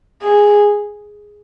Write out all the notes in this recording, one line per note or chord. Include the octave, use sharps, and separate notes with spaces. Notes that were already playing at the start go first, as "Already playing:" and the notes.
G#4